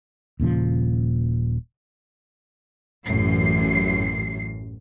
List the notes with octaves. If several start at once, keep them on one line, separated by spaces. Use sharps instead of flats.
D#1 A#2 C#3 F3
A1 F#2 C7